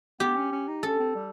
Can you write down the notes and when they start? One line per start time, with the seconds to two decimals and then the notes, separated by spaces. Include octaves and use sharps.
0.20 B3 G4
0.36 C#4
0.52 C#4
0.68 D#4
0.83 C#4 A4
0.99 C4
1.15 G3